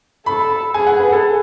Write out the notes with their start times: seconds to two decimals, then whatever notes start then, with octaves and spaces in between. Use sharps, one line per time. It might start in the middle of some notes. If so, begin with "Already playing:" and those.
0.26 A4 B5
0.74 G#4 G#5
0.87 F#5
0.99 B4
1.12 A4